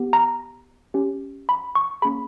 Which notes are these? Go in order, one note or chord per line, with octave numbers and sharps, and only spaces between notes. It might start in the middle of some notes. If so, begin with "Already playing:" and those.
Already playing: B3 G4
A#5
C#4 G4
B5
C#6
A#3 C#4 G#4 B5